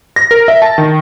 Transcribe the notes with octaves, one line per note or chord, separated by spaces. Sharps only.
A#6
A#4
E5
A5
D#3